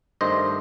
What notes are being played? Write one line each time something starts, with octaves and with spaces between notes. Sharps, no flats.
G2 D#3 A3 C5 D#5